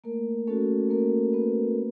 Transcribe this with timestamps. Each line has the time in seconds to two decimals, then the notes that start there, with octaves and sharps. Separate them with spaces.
0.04 A3 A#3 A#4
0.47 A3 C#4 F#4 A4
0.90 A3 A#3 A#4
1.33 B3 C#4 F#4 B4
1.76 A#3